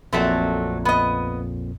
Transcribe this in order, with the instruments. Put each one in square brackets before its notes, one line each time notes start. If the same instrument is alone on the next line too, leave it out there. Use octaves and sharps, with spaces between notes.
[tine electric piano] A#1 F2 A#2 [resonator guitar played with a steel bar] F#3 A3 C4
[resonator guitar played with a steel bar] B3 D#5